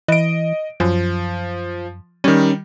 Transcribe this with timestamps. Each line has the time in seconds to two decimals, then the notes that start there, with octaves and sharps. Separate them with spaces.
0.08 E3 D#5 D7
0.80 F#2 F3
2.24 D#3 G3 C#4